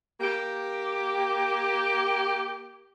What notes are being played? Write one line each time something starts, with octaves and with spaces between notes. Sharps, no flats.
A#3 G4